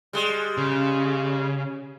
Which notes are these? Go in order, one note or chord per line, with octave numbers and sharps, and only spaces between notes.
G3 G#3
C#3